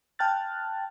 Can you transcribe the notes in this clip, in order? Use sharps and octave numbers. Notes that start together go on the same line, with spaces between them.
G5 A5 F6 F#6 A6